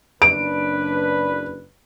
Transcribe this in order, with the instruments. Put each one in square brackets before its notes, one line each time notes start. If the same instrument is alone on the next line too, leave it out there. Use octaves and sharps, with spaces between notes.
[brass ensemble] F#1 D4 B4 [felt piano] D7